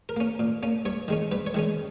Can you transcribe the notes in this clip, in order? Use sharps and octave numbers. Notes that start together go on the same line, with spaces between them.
A#4
A#3 C#4
A#2
A#3 C#4
G2 C#5
D#3 G#3 C#4
G2 B4
C#5
D#3 G#3 C#4